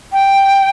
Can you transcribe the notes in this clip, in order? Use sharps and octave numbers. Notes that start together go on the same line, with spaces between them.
G5